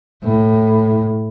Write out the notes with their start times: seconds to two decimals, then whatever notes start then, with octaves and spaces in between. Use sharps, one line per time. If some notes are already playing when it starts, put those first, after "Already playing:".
0.24 A2